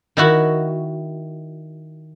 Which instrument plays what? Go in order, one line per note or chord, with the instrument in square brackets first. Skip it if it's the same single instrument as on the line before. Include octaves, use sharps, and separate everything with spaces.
[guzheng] D#3 E4 F#4